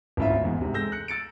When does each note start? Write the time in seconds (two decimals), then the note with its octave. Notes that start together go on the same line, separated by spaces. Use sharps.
0.17 G#1 D2 C#4 E4 F4 E5
0.44 E2 G#2
0.61 G#2 C3
0.74 G#3 A4 E6 G6 A#6
0.92 F#6 C#7
1.08 E6 A6 C#7 D7